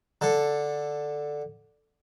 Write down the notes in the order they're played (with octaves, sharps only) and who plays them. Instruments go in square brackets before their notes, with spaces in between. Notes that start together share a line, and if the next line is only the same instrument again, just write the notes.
[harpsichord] D3 A4